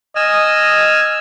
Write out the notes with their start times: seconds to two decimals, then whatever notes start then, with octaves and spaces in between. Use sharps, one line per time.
0.15 D#5 G#5 E6 F6